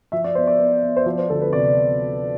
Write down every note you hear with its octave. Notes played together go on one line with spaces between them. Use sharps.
F3 E5
D5
B3 C5
D5
B3
B3
C5
F3 D5
C5
D2 A4
B4
C3 D5